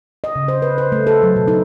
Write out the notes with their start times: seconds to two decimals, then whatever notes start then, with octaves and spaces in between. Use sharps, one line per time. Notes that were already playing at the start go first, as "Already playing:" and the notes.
0.24 D#5
0.36 C#3
0.48 C5
0.62 B4
0.78 C5
0.92 A3
1.07 A4
1.23 F#3
1.36 B2
1.48 D#4